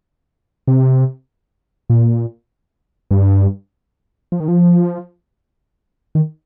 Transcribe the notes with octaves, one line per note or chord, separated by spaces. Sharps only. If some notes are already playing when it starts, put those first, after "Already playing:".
C3
A#2
G2
F3
D#3
F3
D#3